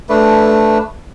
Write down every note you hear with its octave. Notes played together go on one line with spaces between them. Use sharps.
A3 D4 B4